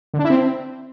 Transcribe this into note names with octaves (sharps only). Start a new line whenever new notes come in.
D3
D4
E4
C4